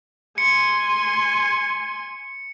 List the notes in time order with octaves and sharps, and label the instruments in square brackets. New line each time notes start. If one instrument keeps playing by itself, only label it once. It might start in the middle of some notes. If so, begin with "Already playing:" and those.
[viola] G#5 C6 [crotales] C#7